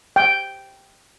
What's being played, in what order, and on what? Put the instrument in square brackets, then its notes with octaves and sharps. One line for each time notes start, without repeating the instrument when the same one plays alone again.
[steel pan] G5